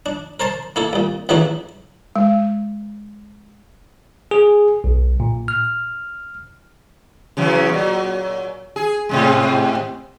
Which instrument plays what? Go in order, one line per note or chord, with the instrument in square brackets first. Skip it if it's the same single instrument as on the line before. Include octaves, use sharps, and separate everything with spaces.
[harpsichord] D4
A#4 C5 A5 C6
A#3 E4 A4
C2 A#2
A1 C#3 E3 F#3 D4 E4
[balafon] G#3
[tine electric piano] G#4
B1
A#2
F6
[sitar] C#3 E3 F#3
A#2 F#3
G#4
G#2 C3 G#3